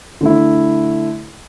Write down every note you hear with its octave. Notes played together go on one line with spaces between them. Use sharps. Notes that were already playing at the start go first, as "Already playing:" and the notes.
D3 A3 E4